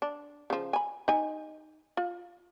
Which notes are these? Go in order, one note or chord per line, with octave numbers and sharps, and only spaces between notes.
D4
C#3 F3
G#5 B5
D#4 G#5
F4